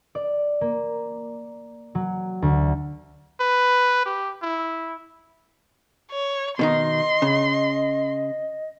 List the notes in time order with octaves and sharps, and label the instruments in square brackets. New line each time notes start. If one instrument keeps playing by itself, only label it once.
[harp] D5
A#3
F#3
D2
[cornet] B4
G4
E4
[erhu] C#5
[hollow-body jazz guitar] B2 D#3 D#4 [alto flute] D#5 [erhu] C6
[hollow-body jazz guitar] C#3